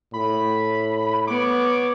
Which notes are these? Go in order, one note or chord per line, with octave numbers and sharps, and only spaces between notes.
A2 B5
B3 C#5 D6